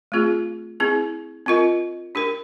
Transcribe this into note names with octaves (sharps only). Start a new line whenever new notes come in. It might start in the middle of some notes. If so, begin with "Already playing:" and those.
A3 C4 F4 G#4
C4 E4 G#4
C4 F4 A#4 D#5
D4 G4 A#4